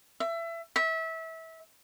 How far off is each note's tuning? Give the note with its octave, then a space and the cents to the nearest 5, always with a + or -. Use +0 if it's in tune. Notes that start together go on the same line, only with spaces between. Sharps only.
E5 +25
E5 -25